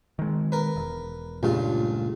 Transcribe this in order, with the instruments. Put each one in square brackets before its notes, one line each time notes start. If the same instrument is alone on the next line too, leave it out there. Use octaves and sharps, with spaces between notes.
[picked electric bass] D#3 G#3
[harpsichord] A#4 B4
[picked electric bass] E1
[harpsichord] C#2 G2 F4 [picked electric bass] A#2 G3 A3